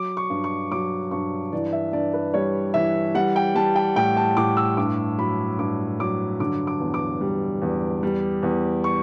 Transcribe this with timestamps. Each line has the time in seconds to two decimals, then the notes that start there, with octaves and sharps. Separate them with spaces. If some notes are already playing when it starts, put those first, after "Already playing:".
Already playing: F#3 D6
0.17 C#6
0.30 G2
0.44 C#6
0.72 F#3 D6
1.11 G2 C#6
1.53 E3 D5
1.73 E5
1.93 G2 D5
2.13 B4
2.34 G3 C#5
2.74 E3 E5
3.15 G3 F#5
3.36 G5
3.55 G3 A5
3.76 G5
3.96 A2 G5
4.17 A5
4.37 A2 D6
4.57 E6
4.77 G2 D6
5.18 F#3 B5
5.59 G2 D6
5.99 F#3 D6
6.40 D3 D6
6.67 D6
6.80 E2
6.94 D6
7.21 G3
7.62 E2
8.03 G3
8.43 E2
8.84 C#6